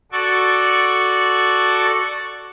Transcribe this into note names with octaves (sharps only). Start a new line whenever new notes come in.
F#4 A4 D5 C#6